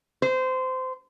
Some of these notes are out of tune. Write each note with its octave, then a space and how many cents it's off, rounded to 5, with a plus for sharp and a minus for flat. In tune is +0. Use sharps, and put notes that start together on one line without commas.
C5 -20